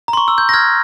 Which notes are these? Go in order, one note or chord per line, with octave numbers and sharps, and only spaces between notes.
A#5
C6
C#6
E6
G6
A#6
F6 G#6